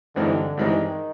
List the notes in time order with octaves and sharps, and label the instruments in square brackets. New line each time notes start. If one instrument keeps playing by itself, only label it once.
[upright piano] G2 E3 G#3 C4 D#4 [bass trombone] D3
[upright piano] G2 E3 G#3 C4 D#4 [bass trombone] D#3